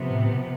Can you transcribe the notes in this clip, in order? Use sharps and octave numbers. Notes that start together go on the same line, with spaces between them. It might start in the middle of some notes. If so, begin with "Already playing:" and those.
Already playing: C3 F3 B3
A2
B2